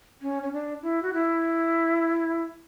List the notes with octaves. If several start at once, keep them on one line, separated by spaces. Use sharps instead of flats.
C#4
C#4
D4
E4
F#4
E4